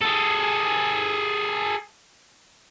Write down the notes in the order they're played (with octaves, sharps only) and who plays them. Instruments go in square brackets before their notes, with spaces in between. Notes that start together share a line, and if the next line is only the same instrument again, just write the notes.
[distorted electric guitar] G#4 A4